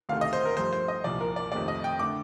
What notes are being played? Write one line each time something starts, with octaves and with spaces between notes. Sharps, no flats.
D2 C3 D#3 A3 F5
D#5
C5
A#4
G2 F3 A3 C5
C5
D#5
C2 A#2 F3 D5
A#4
D5
F2 C3 D#3 A3 D5
D#5
G5
D3 A3 D6